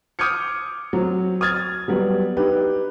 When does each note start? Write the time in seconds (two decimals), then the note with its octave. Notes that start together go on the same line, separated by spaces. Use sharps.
0.19 D6 D#6 F6 G6 G#6 C#7
0.93 F#3 C4
1.41 D#6 F6 G#6 A6
1.88 F#3 G3 B3
2.36 D4 D#4 G4 B4